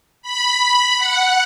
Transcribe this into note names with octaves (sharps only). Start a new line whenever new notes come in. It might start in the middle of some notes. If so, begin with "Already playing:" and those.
B5
F#5